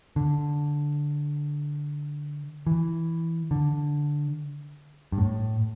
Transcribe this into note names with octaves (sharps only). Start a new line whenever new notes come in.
D3
E3
D3
G2
A2